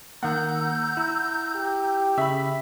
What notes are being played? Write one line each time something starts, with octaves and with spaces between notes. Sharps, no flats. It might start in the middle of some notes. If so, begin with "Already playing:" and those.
D#3 A#3 F#5 A#5 E6 G6
E4
G4
C#3 E5 B5